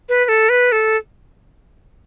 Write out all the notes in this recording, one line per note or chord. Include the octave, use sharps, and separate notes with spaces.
B4
B4
A4
B4
A4